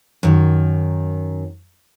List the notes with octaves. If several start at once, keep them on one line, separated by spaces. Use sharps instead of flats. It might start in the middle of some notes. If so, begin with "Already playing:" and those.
F#2 D#3